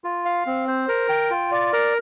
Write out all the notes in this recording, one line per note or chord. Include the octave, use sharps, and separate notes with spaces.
F4
F5
C4
C5
A#4
G5
F4
D5
A#4